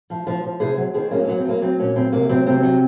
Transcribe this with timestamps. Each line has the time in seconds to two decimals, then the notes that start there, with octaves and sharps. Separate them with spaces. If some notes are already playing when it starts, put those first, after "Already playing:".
0.10 F3
0.27 F3
0.44 F3
0.60 C3 G#4 C5
0.77 F#3
0.94 D#3 G#4 C5
1.11 F#3 A#3 C#4
1.24 A#3 C#4
1.29 F#3
1.37 C4
1.45 F#3 A#3
1.62 F#3 C4
1.79 A#2 A#3 C#4
1.96 F#3 C4
2.12 C3 A#3
2.29 F#3 C4
2.46 C3 C4
2.63 F#3